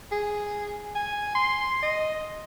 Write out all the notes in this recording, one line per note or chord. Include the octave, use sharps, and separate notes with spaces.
G#4
G#5
C6
D#5